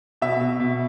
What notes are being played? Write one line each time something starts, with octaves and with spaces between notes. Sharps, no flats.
B2 E5
B2
B2